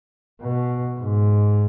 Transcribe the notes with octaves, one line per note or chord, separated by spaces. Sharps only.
B2
G#2